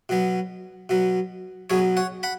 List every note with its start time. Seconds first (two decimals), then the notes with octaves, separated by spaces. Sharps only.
0.09 B2 F#3 B3
0.89 B2 F#3 B3
1.70 B2 F#3 B3 G#4 C#5
1.97 C#5 F#5
2.23 F#5 B5